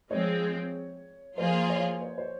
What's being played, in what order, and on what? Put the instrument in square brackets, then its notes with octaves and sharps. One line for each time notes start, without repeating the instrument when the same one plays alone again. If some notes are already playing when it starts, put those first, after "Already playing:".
[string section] F3 G#3 C4 [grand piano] C#5
[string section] F3 A#3 F4 G#4 [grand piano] C5
[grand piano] C#5
C5
C5